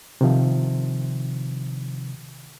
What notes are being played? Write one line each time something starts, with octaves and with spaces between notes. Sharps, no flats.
C3 D#3 F3